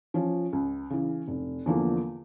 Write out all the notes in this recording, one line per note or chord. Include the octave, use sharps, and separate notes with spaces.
F3 C#4
C#2
C#3 E3
F1
E2 D3 F3 A#3